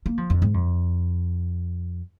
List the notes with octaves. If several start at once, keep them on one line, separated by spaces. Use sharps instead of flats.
A#3
F3
F2
G#2
F2